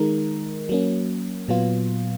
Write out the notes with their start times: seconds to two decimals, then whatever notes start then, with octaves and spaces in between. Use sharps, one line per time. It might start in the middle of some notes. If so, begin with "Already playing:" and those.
Already playing: D#3 G#3 D#4 A#4
0.69 F#3 A#3 C#4
1.48 A#2 F#3 B3 F4